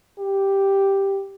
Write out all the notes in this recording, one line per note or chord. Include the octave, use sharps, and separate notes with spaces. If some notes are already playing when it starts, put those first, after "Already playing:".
G4